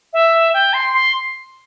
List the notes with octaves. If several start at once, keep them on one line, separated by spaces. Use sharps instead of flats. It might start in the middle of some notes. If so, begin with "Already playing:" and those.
E5
G5
C6
C6